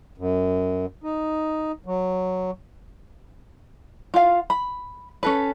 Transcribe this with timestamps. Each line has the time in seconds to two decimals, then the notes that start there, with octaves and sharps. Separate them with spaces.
0.18 F#2
1.03 D#4
1.86 F#3
4.14 F4 F5
4.50 B5
5.23 C#4 A4 B4